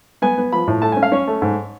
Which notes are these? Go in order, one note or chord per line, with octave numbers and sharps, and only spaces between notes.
B3 G#5
B3
F3 B5
A2
A3 A5
G#5
C#4
F5
C#4 C#5
A3
G#2